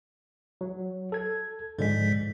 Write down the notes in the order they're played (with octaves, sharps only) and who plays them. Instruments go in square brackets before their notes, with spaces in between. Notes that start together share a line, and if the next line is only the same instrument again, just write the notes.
[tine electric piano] F#3
A4 G#6
[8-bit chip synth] G#2 B6 [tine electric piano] D3 F3 G#3